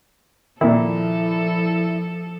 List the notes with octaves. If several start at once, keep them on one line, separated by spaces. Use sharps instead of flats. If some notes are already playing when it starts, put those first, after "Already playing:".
A#2 D#3 F3 E4 A4